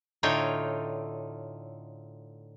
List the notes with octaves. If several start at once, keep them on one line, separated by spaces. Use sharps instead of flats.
A2 D3 D#4 F4 C#5 G5